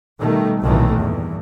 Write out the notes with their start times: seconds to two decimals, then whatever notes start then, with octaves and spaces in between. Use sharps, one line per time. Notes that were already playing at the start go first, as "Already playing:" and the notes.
0.20 B2 D#3 G3 A3
0.62 B1 F2 A#2 D#3 E3 A3
0.98 E2 G2 A#2